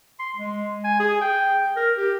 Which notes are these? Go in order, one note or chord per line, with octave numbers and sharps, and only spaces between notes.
C6
G#3
G#5
G#4
G5
A#4
G4